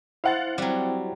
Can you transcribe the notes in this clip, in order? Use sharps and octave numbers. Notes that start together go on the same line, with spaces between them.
E4 C5 F5 F#5 A6
F#3 G3 C4